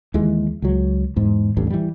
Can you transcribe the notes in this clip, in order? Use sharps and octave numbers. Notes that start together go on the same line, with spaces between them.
D#2 E3 G#3
C#2 F#3
E2 G#2
A1 E2 G2
E3 G3